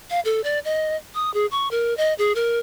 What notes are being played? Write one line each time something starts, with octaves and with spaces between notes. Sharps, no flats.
F5
A4
D5
D#5
D#6
G#4
C#6
A#4
D#5
G#4
A#4